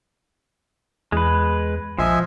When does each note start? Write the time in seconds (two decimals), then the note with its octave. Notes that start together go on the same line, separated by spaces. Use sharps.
1.12 E2 G#3 B4
1.99 A#1 F3 D#5 E5 G#5